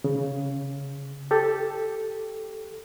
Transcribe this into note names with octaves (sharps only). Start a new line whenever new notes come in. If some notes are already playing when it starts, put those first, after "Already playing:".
C#3
G4 A4